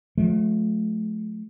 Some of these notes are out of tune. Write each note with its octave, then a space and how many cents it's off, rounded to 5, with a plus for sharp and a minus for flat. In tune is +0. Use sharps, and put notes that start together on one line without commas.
F3 +30 A3 -30